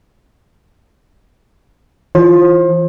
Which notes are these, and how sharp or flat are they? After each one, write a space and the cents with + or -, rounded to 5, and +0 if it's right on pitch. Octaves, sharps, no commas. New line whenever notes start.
E3 +0 F4 +0 C5 +30